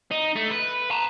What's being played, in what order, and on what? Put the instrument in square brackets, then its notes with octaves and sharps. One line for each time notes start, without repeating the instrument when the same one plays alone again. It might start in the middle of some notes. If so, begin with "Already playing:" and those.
[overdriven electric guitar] D#4
A3
B4
A5 A#5